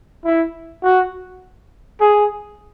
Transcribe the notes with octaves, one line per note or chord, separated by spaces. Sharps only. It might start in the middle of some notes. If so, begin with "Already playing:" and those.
E4
F#4
G#4